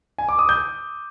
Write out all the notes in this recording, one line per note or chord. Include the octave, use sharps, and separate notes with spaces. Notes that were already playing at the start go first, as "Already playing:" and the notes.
G#5
D6
D#6
G6